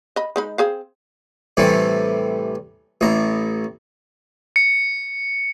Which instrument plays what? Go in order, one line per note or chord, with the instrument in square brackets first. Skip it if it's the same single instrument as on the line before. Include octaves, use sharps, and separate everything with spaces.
[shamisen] D#5 B5
G#3 D#4 B5
C4 G#4 F5
[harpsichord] A2 C3 E3 G3 A3
A1 A2 A#5
[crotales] C#7